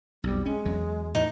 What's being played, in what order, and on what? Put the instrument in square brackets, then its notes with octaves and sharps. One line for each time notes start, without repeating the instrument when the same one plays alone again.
[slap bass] B1 F2 [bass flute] G3
[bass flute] G#3 [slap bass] C#4
[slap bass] E2 F#3
[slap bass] A2 E3 A3 [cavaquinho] D#4